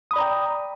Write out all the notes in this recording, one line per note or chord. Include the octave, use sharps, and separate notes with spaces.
D5 G5 A#5 B5 D#6